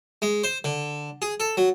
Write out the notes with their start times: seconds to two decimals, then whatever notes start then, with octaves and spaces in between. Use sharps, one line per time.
0.22 G#3
0.44 C5
0.64 D3
1.22 G#4
1.40 A4
1.57 F#3